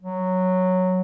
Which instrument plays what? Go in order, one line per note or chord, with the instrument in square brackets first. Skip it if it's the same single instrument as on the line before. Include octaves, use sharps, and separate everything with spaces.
[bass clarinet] F#3